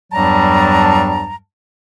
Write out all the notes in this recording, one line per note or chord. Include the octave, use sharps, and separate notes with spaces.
E2 G2 F#3 G3 A5 A#5